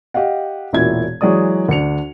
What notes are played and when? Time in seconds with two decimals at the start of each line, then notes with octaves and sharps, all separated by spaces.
0.14 G4 D#5 F5 F#5
0.73 E1 A#2 E4 F#4 G#6
1.21 E3 F#3 G#3 D5 D#6
1.69 D2 D4 C#7 F7